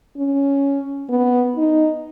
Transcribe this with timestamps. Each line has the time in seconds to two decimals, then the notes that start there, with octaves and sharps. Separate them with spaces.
0.17 C#4
1.09 B3
1.56 D#4